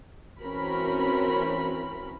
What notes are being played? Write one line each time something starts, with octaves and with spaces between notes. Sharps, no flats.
E3 C4 C#4 F#4 A#4 B5